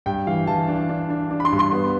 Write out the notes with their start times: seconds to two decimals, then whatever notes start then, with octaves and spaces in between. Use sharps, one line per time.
0.06 G2 G5
0.27 E3 F5
0.47 E3 A5
0.68 D4
0.89 D4
1.10 D4
1.31 D4
1.40 B5
1.45 C6
1.52 G2
1.59 C6
1.73 B3